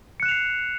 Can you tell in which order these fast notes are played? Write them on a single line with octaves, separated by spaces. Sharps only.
C#7 F#6 E7 F7 C7